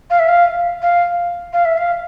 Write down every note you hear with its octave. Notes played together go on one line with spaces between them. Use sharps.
F5
E5
F5
F5
F5
E5
F5